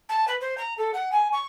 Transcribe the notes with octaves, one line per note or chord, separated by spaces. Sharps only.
A5
B4
C5
A#5
A4
F#5
G#5
C#6